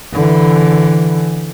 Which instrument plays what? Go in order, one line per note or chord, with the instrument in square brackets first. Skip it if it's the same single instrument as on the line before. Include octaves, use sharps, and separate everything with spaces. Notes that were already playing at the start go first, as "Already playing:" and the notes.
[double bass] D3 E3